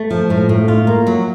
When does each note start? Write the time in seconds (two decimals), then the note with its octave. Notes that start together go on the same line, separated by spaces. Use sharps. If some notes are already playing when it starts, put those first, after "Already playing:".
Already playing: A3
0.10 F3
0.30 A2
0.49 A2
0.68 F4
0.87 A#3
1.07 F#3